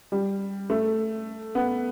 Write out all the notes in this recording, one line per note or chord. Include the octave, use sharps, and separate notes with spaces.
G3
A3
B3